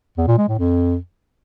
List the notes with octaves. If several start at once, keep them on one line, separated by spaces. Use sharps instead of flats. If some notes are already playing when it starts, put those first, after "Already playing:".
E2
A#2
G#3
A2
F2